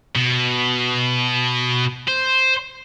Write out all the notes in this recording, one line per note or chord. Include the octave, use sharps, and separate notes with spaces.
B2
C5